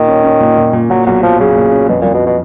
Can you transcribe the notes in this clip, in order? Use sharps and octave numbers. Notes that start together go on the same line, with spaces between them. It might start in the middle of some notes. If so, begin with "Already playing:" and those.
Already playing: A#2 D#3
C#4
C#4
A#2
A#2
A#2
A#2 F#3
B1 F#3
F3 F#3
C#3 F#3
A#2
C#4
F2 B2
F2 A#2
B2
B2